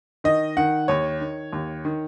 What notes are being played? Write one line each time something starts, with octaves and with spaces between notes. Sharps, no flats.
D#3 D#5
D#3 F#5
D#2 C#5
D#3
D#2
D#3